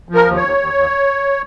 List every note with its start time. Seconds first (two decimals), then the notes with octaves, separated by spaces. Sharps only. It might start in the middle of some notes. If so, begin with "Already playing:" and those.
0.09 F3
0.15 A#4
0.25 D#2
0.36 C#5
0.41 D#2
0.57 D#2
0.74 D#2